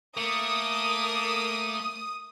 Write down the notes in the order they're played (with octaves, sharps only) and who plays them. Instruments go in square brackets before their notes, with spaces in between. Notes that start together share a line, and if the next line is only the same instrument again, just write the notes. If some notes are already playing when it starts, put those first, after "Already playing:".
[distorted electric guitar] A3 [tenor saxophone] A#3 [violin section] D#6